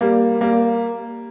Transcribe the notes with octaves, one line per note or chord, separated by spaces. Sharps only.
G3 A#3
G3 A#3